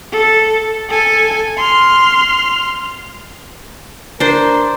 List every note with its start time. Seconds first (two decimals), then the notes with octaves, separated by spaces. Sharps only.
0.12 A4
0.89 A4 G#5
1.57 C6 F6
4.20 D4 A#4 C5